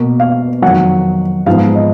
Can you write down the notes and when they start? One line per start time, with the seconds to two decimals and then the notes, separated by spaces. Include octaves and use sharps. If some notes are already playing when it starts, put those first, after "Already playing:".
Already playing: B2 A#3
0.20 F5
0.62 F2 D#3 F#3 F#5
1.46 G#2 F3 B3 F5
1.75 D#5